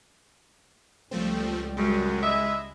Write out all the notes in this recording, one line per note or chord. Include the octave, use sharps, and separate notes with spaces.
C#2 F3 G3 A3 C4
F#2 G#3
E4 D#5 E5